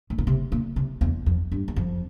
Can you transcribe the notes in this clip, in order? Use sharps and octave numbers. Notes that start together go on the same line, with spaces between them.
A2
A#2
C3
A#2
C3
E2
F2
G2
E2
F2